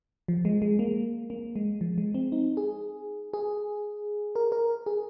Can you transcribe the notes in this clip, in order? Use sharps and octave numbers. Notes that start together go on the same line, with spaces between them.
F3
G#3
G#3
A#3
A#3
G#3
F3
G#3
C4
D#4
G#4
G#4
A#4
A#4
G#4